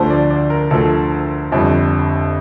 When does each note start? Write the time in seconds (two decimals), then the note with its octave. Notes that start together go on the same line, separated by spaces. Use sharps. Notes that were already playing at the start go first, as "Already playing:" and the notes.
Already playing: D2 D3 F3 A3 C5
0.10 D5
0.30 D5
0.50 A#4
0.70 D2 D3 F3 A3 A4
1.52 G1 F2 D3 G3